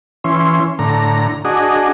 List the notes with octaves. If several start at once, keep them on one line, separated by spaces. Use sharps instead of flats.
E3 C#4 C6
A2 D3 A#5
D4 F#4 G#4 D#5